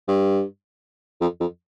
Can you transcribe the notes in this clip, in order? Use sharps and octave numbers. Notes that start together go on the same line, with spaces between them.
G2
F2
F2